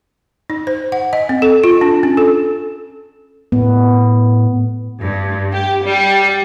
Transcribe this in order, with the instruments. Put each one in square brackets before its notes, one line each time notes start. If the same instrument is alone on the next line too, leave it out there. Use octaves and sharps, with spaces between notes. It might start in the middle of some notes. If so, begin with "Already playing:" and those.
[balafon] D#4
C5
F#5
D#5
C4
A4
F4
D4
C#4
A4
[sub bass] A2 [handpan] B3
[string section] G2
G4
G3